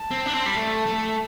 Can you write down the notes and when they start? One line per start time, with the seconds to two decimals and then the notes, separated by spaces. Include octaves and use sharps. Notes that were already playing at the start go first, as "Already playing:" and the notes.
Already playing: A5
0.11 C4
0.26 D4
0.33 C4
0.46 G3
0.56 A3
0.86 A3